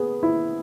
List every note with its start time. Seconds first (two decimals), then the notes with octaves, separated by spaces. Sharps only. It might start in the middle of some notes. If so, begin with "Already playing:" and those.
Already playing: B3 G#4
0.23 E4